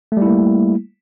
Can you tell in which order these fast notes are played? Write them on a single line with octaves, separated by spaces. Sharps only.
A3 G3 E4 A#3